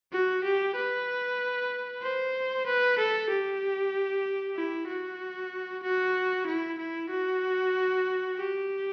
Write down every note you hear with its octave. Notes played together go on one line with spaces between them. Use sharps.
F#4
G4
B4
C5
B4
A4
G4
E4
F#4
F#4
E4
E4
F#4
G4